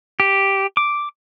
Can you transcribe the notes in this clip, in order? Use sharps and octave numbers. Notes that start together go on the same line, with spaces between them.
G4
D6